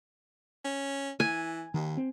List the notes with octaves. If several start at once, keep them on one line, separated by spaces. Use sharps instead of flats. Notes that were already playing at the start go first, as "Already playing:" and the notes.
C#4
E3 G#5
D#2 D#3
C4